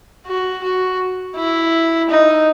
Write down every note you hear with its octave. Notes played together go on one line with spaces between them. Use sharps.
F#4
F#4
E4
D#4